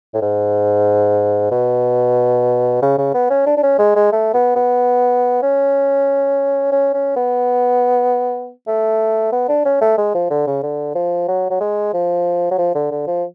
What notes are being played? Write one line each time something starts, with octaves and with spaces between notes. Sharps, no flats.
A2
G#2
B2
C#3
C#3
B3
C#4
D4
D4
C#4
G#3
G#3
A3
B3
B3
C#4
C#4
C#4
B3
A3
B3
D4
C#4
A3
G#3
F3
D3
C#3
D3
F3
F#3
F#3
G#3
F3
F#3
F3
D3
D3
F3